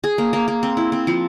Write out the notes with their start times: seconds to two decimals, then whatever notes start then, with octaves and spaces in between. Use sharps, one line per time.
0.04 G#4
0.18 A#3
0.33 A#3
0.48 A#3
0.63 C4
0.77 E4
0.92 C4
1.07 F3